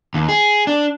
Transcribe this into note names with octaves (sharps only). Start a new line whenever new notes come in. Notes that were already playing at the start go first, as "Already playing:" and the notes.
D#2
G#4
D4